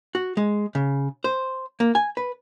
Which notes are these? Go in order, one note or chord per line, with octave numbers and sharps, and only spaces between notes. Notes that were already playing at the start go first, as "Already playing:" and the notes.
F#4
G#3
C#3
C5
A#3
G#5
B4